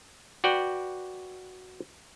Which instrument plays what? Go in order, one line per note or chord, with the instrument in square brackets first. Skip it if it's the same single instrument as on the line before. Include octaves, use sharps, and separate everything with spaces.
[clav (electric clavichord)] F#4 B4 D5 F#5 G5